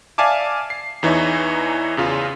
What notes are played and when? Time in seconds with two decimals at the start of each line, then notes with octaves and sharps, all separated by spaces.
0.18 D5 E5 F5 G#5 A5 D6
0.70 C7
1.03 E2 E3 D#4 C#5 E5
1.97 E2 C#3 F4